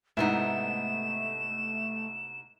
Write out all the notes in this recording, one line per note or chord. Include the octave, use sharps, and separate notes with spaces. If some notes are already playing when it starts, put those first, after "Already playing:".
G#2 C3 A3 B3 D#4 E4 E7